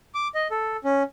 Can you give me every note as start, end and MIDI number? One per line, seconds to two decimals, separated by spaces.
0.14 0.28 86
0.35 0.48 75
0.51 0.77 69
0.84 1.03 61